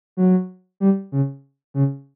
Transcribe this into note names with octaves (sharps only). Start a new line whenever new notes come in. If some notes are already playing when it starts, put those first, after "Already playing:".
F#3
G3
C#3
C#3